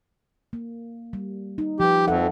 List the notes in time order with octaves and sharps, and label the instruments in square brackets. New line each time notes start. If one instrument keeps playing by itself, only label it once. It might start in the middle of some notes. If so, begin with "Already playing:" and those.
[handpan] A#3
G3
D#4
[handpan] F3 B4 [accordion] G4
[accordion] F2 [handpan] A4 E5 F#5